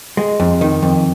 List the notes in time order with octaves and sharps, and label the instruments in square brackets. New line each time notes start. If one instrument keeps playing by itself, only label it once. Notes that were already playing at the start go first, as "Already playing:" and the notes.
[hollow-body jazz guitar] G#3
F2
D#3
F2